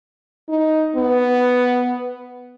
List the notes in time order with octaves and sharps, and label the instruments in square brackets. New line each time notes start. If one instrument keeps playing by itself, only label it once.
[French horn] D#4
B3